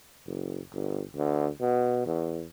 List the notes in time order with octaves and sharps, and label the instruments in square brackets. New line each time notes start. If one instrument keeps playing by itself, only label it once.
[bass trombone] F#1
G1
D2
B2
E2